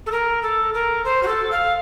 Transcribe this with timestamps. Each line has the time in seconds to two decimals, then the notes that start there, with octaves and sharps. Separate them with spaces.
0.06 A4
0.11 A#4
0.42 A4
0.73 A#4
1.04 C5
1.22 F#4
1.27 A4
1.51 F5